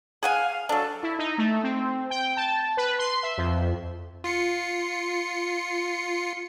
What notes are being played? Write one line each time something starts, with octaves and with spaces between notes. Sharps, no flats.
G#4 F5 F#5 G#5
F5
F#3 D4 A4
E4
D#4
A3
C4
G5
A5
B4
C6
E5
F2
F4 C7 C#7